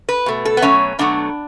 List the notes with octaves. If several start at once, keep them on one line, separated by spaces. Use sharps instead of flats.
B4
B2 A3
A4
B3
B2 F#3 A3 C#4
B2 F#3 A3 D4